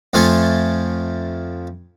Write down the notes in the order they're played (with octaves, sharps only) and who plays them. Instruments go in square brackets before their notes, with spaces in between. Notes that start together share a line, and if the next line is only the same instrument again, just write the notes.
[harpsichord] F2 F3 A3 F4 A4 G#5